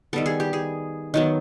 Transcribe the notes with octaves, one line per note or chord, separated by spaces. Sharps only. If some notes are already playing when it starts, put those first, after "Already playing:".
D#3 G3 B3 A4
G#4
G4
G#4
D#3 F#3 B3